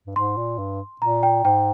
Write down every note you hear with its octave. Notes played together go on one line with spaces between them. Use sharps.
G2
G#2 C6
A#2
G2
A#2 A#5
G5
G#2 G5